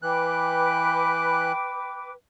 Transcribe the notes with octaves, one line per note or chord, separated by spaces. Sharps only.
E3 B4 G5 D6 F#6